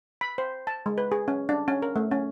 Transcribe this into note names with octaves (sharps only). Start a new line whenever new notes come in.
B5
C5
A5
G#3
B4
G#4
C#4
D4
C#4
A#4
A3
C#4